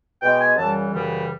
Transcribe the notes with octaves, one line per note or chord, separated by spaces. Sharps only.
B2 G#3 B3 G5
G#5
F#2 C#3 E3 G3 A5
F#2 C#3 E3 G3